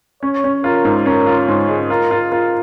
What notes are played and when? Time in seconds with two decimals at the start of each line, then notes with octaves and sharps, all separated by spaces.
0.23 C#4 C#5
0.44 C#4
0.64 F4 A#4
0.85 G#2
1.06 C#4 A#4
1.26 F4
1.48 G#2 C#4
1.68 G#3
1.89 F4 A#4
2.11 F4
2.31 F4 A#4